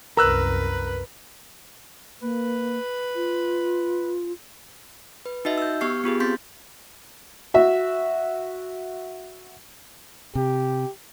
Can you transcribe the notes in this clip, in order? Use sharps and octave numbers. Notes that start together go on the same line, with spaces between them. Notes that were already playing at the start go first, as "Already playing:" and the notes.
C2 F#2 A#4 B4 A#5 E6 F#6
A#3 B4
F4
B4
D#4 F#4 D#5 E5
E6 G6
B3 G4 C#6 F6 C7
B3 F4 G4 G#4
C4 C6 G6 A6 B6
F#4 E5
C3 G4